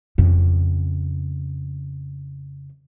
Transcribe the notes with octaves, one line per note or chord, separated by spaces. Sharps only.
F2 C#3